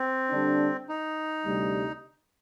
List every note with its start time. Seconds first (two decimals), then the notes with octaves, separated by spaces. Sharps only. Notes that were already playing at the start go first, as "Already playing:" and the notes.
Already playing: C4
0.30 D3 G3 D4
0.89 D#4
1.46 D2 C3 G3